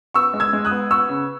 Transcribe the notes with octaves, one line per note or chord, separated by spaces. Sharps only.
B3 C#6 E6
G#3
E6 G#6
G#3
D#6 F#6
B3
B3 C#6 E6
C#3